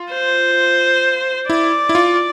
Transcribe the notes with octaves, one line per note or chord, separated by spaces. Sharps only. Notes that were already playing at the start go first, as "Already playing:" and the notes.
Already playing: F4
C5
E4 D5
E4
F4